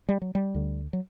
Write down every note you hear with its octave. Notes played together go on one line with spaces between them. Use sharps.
G3
F#3
G3
D2 D3
F#3